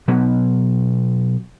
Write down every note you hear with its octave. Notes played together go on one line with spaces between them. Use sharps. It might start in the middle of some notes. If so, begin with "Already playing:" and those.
B2 F#3 B3